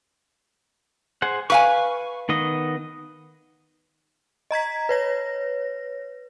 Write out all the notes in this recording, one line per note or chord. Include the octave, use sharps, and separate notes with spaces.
G#4 C5 F#5
B4 F5 G#5 C#6
D#3 B3 D#5
D#5 A#5 G#6 B6
B4 C#5 A#6